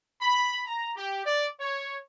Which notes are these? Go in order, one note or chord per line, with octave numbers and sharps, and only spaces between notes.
B5
A#5
G4
D5
C#5